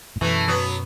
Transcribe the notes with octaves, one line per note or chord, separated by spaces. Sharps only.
A2
F#2 B2 E3 A3
F#3 B3